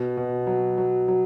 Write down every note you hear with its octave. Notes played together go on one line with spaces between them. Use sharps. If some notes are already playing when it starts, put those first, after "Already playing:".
Already playing: B2
B2
F#3
F#3
F#3